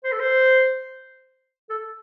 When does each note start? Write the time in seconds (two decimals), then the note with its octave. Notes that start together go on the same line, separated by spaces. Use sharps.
0.04 C5
0.12 A4
0.20 C5
1.70 A4